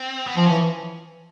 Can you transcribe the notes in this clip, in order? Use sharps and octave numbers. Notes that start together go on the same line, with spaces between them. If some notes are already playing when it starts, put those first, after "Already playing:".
Already playing: C4
B3
F3 C4
E3 C#4